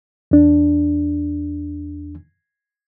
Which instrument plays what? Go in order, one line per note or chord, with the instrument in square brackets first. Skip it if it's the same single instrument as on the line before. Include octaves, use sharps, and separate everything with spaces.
[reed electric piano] E2 D4